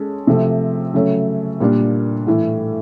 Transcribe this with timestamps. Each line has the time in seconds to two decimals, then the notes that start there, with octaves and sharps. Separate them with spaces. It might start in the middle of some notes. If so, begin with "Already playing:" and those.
Already playing: G#3 C#4 A4
0.27 C3 F3 A3
0.94 C#3 F#3 A3 C#4
1.60 A#2 G3 A#3 D4
2.27 A2 E3 A3